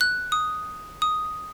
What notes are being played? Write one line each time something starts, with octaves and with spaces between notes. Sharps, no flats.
F#6
D#6
D#6